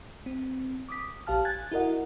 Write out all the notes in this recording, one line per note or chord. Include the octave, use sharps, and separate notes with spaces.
C4
D6 D#6 B6
A#1 G4 F5 A5 F6
G#5 F#6 G#6 A6
E4 F#4 A#4 D#5 F#5